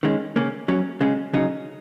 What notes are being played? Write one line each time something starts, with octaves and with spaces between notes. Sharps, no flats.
D#3 G#3 C#4
C#3 A#3 C#4
F#3 C#4
C#3 G#3 C#4
C#3 F#3 D#4